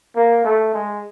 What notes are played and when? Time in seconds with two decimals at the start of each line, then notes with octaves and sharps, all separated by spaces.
0.16 A#3
0.44 A3
0.74 G#3